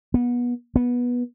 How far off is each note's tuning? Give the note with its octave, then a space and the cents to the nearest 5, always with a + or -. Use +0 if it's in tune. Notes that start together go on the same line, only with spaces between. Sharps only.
B3 -25
B3 -15